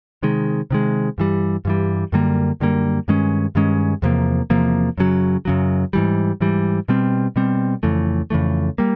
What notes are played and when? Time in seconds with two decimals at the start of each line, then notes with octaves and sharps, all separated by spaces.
0.23 C3 D#3 G#3
0.71 C3 D#3 G#3
1.18 G2 E3 G3
1.65 G2 E3 G3
2.12 F#2 D3 G3 A#3
2.60 F#2 D3 G3 A#3
3.08 G2 D#3 G#3 C#4
3.55 G2 D#3 G#3 C#4
4.02 E2 C3 F3 A#3
4.50 E2 C3 F3 A#3
4.98 F#2 C#3 F#3
5.45 F#2 C#3 F#3
5.93 G#2 E3 G3
6.41 G#2 E3 G3
6.88 B2 G3 C4
7.36 B2 G3 C4
7.83 F2 C#3 E3 A3
8.30 F2 C#3 E3 A3
8.78 G3 A#3